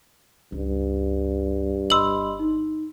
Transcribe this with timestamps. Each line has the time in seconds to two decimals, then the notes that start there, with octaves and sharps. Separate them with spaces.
0.52 C#2 G2
1.90 G1 D#5 B5 C6 E6 F#7
2.39 D#4